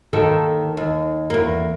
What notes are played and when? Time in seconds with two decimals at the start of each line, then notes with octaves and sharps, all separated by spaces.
0.13 D#2 D#3 A4
0.77 D#2
1.30 E2 A#3